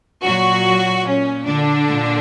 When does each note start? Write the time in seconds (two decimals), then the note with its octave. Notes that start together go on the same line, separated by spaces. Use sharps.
0.24 A#2 F#3 F#4
1.06 A#2 C#4
1.47 D3 D4
1.88 A#2